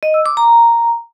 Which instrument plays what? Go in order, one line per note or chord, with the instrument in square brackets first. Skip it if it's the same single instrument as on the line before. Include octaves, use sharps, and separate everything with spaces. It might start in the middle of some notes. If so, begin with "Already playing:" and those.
[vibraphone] D#5
E6
D6
A#5